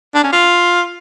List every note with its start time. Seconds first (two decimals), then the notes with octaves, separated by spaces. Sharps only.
0.15 D4
0.24 C#4
0.33 F4